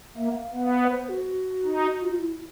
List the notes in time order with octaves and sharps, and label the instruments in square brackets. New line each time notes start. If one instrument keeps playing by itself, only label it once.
[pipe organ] A#3 [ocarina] E5
[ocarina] F#5
F5
[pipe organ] B3 [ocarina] F#5
[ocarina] F5
F#5
B4
C5
F#4
[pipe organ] D#4
[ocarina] F4
F4
E4